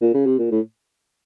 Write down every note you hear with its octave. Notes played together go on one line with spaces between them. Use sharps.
A#2
C#3
C3
A#2
A2